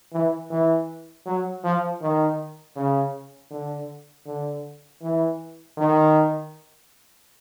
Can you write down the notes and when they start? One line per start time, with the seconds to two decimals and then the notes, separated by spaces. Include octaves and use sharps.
0.13 E3
0.51 E3
1.26 F#3
1.64 F3
2.01 D#3
2.76 C#3
3.51 D3
4.26 D3
5.02 E3
5.77 D#3